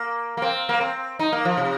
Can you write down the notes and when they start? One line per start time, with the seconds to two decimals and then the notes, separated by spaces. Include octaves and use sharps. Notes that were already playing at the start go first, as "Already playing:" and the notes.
Already playing: A#3
0.37 A#3
0.42 C4
0.69 A#3
0.81 C4
1.19 D#4
1.32 A#3
1.45 F3
1.57 C3